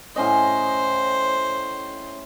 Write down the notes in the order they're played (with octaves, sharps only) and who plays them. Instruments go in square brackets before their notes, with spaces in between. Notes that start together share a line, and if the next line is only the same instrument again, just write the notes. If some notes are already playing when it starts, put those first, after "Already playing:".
[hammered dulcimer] A2 C#4 D#5 [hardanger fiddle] C5